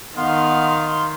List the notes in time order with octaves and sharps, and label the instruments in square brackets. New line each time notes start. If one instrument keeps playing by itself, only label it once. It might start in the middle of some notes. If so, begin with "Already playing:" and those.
[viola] D#3 [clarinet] B3 [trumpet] F5 [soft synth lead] C6